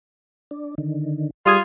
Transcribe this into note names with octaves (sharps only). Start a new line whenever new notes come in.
D4
D3 D#3
G3 F4 G#4 D#6 G#6